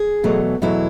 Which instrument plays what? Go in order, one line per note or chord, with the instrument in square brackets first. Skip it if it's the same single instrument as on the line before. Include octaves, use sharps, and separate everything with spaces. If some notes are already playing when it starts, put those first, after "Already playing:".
Already playing: [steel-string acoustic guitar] G#4
E2 B2 F#3 A3
E2 B2 F#3 A3 E4